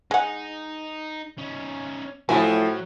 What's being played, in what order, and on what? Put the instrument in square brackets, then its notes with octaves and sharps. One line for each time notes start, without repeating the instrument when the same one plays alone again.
[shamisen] G#3 F#5 [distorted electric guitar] D#4
[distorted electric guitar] C#4 D#4
[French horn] A2 [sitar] F3 E4 F#4 [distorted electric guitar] F#3 [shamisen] G#5